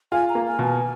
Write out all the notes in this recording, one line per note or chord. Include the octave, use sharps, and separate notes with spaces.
F4 G#5
A#5
A#3
G#5
B2 G#5